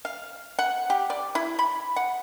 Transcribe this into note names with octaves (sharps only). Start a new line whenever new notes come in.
F5
F#5
G4
D5
E4
B5
F#5